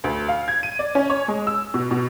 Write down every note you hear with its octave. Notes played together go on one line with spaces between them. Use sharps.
D2
F5
G#6
D#7
D5
C#4
C#5
G#3
E6
B2
B2